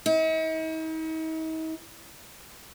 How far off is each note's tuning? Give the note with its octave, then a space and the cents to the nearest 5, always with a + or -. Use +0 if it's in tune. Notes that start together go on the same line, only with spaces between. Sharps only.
D#4 +45